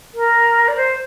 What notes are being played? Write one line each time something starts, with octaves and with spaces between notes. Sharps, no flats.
A#4
D5
C5